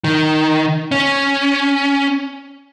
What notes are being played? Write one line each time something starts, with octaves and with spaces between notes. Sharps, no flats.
D#3
C#4